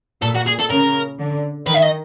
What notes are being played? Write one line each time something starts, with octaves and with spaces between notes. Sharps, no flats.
A#2 A4
F#4
G#4
A4
C#3 A#4
D3
D#3 B4
E5
D#5